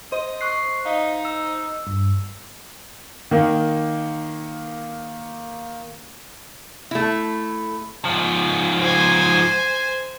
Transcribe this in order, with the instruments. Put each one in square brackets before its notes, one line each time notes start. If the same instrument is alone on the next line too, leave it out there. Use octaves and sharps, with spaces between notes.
[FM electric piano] C5 [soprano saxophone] D#5
[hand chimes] C#6 F#6 C7
[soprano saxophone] D#4 [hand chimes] F5
[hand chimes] E6
[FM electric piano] G2
[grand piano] D#3 A#3
[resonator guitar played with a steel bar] A3 E4
[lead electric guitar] G#2 F3
[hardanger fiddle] C5 G#5